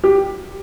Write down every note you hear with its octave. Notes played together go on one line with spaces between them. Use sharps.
G4